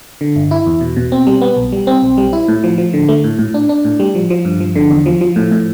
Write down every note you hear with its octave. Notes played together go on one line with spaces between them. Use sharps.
D3
G1
E4
E2
B2
B2
C4
G3
B3
B1
G3
C4
B1
G3
E4
A2
F3
F3
D3
A3
A2
A2
D4
D4
A2
G3
F3
F3
G2
F3
D3
E2
F3
F3
A2
A2